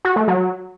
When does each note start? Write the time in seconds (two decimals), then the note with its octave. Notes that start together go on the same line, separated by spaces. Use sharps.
0.05 F#4
0.16 A3
0.28 F#3